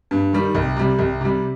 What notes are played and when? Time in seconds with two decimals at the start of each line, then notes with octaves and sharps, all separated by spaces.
0.11 G2
0.33 D#3 G3
0.55 C2
0.76 C3 G3
0.99 C2
1.21 C3 G3